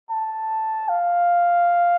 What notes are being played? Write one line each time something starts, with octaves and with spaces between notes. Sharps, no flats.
A5
F5